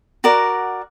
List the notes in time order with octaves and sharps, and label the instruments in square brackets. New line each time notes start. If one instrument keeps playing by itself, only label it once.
[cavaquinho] F#4 A#4 D5 F#5